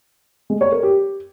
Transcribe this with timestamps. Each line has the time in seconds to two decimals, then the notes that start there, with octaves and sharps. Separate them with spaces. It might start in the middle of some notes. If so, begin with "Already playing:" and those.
0.50 G#3
0.61 C#5
0.72 A#4
0.83 G4